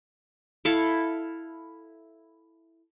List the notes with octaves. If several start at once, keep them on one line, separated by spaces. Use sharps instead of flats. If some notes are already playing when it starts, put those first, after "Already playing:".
E4 A4 F5